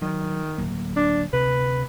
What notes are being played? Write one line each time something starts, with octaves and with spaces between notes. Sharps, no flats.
D#3 F#3
D1 F#3 A#3
D4
D2 C3 B4